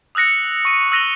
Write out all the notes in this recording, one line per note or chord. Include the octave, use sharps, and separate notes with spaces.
D#6 E6 F#6 A#6 C#7
C#6 D#7
E6 F#6 A#6 D#7 F7 G7